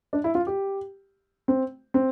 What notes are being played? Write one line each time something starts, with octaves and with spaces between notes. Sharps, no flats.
D4
E4
F4
G4
C4
C4